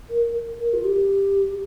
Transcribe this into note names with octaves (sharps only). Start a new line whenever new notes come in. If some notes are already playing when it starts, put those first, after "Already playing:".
A#4
A#4
F4
G4